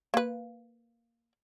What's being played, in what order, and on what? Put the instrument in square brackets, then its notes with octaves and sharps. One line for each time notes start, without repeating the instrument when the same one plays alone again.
[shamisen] A#3 B4